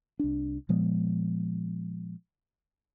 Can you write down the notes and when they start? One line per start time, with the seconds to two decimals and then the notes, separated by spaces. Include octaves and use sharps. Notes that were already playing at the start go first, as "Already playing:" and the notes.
0.19 C2 D4
0.69 A#2 F3 G#3 B3